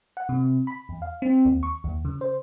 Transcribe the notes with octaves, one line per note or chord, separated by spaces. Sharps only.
F#5
C3
B5
E2
F5
C4
D#2
C#6
D#2
C#3
C5